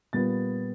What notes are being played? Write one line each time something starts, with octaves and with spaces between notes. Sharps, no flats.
A#2 G3 B3 A6